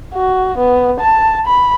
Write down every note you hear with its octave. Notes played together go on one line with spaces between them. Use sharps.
F#4
B3
A5
B5